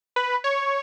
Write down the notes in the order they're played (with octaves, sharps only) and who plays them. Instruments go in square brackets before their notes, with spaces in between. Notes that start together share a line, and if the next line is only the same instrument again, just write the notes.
[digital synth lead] B4
C#5